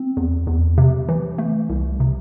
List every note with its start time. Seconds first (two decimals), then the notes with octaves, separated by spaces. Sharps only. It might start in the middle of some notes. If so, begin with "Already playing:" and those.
Already playing: C4
0.17 E2
0.47 E2
0.78 C3
1.09 E3
1.38 A3
1.69 C2
2.00 C3